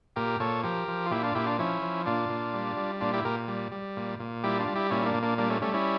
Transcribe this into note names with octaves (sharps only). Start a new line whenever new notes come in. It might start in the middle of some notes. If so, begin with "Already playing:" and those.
A#2 G4 A#4
A#2 A4 C#5
F3 G4 A#4
F3
F4
A#2 E4 G4
D4 F4
A#2 E4 G4
D4 F4
F3 C#4 E4
F3
A#2 D4 F4
A#2
G3
G3
A#2 D4 F4
E4 G4
A#2 G4 A#4
G3
G3
A#2
A#2
G3 E4 G4
D4 F4
G3
E4 G4
A#2 C#4 E4
E4
A#3 D4
A#2
A#3 D4
G3 A#3 D4
A3 C#4
G3 A3 C#4
C#4 E4